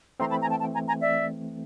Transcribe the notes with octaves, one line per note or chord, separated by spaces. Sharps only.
E3 A3 C4 A#5 C6
A5 B5
G#5 A#5
G5 A5
G5 A5
G#5 A#5
G#5 A#5
D5 E5